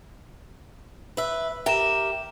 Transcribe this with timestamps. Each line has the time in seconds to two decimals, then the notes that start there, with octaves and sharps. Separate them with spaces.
1.17 B4 E5
1.66 G4 A#4 E5 E7